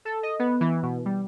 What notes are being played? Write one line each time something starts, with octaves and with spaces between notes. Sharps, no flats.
A4
D#5
B3
E3
B2
G3